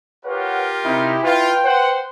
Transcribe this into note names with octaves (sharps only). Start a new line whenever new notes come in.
F4 G4 A#4 B4 C#5 F#5
C3 C4 D#4 E4
F4 B4 G5
C5 F#5